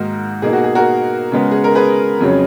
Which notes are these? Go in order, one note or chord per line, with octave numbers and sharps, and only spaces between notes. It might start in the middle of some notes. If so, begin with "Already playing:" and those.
Already playing: G#2 D#3 A#3 D#4 F#4 A#4
B2 A#3 D#4 G#4
F#4
G#4
F#4 A#4
C#3 G#3 B3
G#4
A#4
G#4 B4
F2 C#3 F#3 C#4